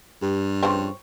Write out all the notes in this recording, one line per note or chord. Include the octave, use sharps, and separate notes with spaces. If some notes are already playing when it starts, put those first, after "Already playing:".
G2 G4
C#3 F3 C4 B4 C5 C#6